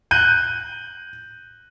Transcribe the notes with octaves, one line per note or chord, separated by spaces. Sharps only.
F#6 G6 D#7